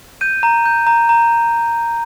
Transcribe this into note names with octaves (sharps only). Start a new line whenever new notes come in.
G6 D#7
A#5
G6
A#5
A#5